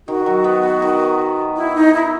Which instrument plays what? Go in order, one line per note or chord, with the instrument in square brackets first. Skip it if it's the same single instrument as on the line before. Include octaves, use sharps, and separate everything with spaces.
[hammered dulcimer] D#3 [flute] F#4
[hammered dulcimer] F#3
B3
B3
D#3
[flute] E4
D#4
E4